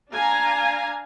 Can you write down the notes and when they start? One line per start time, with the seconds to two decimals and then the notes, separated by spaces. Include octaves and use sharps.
0.12 D4 F5 G#5 A#5